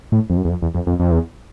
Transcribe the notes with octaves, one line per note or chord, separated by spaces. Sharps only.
A2
F2
F#2
E2
F2
E2
F2
F2
F2
E2